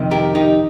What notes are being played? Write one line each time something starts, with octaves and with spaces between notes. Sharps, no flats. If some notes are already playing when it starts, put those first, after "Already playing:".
Already playing: F2 C3 D#3
G4 A#4
D#4 G4